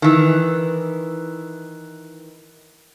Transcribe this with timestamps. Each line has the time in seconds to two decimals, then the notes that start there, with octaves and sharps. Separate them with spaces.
0.02 D#3 E3